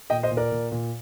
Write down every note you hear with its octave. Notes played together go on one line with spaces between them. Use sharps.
A#2 D#5 G5
C5 D#5
A#2
A#4 D5
A#2
A#2